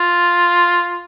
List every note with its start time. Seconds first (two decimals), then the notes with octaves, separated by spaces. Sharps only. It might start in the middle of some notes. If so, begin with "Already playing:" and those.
Already playing: F4